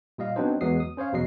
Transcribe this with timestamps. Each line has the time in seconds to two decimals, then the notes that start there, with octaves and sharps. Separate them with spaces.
0.18 A#2 G3 D#5 F5
0.36 F#3 B3 C4 D4 D#4 C5
0.61 E2 F#3 G#3 B3 D#6 C7
0.80 D#6
0.97 C#4 C5 C#5 F5
1.12 E2 B2 F#3 D#5 C7